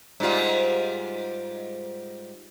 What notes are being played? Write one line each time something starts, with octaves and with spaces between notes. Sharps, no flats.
G#2 G3 F4